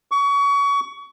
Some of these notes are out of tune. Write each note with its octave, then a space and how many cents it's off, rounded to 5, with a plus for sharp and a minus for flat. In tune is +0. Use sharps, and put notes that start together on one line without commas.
C#6 +30